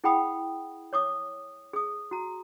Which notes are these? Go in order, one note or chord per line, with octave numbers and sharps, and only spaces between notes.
E4 G#4 F#5 G5 B5 D#6
C#5 D6 D#6
G#4 D#6
F#4 A#5